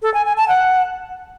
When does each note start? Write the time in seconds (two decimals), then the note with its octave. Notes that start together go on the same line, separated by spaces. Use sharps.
0.02 A4
0.14 G#5
0.25 G#5
0.37 A5
0.49 F#5